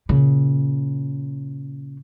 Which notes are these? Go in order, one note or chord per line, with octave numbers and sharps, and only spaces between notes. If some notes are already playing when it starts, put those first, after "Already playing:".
A#2 C#3